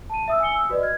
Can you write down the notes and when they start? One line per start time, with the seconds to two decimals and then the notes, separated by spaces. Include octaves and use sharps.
0.10 A5 D#7
0.28 E5 D#6 E6
0.40 G#5 D#6 C#7 G7
0.54 E6
0.69 F#4 B4 D5 D#5
0.81 F6 G#6